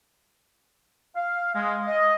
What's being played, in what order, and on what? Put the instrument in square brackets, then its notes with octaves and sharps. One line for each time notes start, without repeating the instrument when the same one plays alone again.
[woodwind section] F5
G#3
D#5